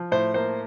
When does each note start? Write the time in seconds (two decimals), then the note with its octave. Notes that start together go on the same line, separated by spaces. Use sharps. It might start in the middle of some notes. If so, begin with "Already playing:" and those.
Already playing: F3
0.12 A2 C5
0.34 A#3 C5